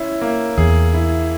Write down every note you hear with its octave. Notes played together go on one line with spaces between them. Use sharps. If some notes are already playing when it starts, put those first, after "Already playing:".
Already playing: C#4 E4
A#3
E2 G#4
E4